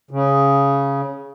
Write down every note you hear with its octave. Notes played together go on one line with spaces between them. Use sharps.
C#3